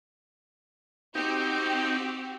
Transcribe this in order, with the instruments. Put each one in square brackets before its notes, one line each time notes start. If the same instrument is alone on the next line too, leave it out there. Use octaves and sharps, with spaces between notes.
[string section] C4 F#4 G4 [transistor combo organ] D#4 G5